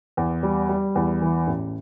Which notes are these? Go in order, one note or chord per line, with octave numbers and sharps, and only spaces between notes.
E2
G3
G3
E2
E3
A1